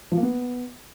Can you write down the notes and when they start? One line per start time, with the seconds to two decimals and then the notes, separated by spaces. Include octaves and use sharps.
0.12 F3
0.17 A#3
0.23 B3